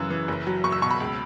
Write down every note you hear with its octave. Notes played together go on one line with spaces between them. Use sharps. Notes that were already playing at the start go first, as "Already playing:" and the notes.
Already playing: F#2 C#3 E3 E6 F#6
E3
F#1
F#3
F#1 C#6
E6
B2 C#6
B5
C#2